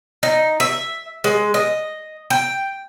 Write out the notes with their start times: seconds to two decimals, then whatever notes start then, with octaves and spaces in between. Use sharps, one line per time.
0.23 D#4
0.60 E5
1.24 G#3
1.54 D#5
2.30 G5